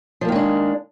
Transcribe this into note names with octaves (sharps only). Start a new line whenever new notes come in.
D#3 F3 G#3 A#3 D4